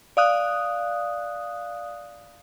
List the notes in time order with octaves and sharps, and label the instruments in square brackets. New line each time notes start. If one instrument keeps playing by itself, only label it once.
[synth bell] D5 F5 D#6 F#6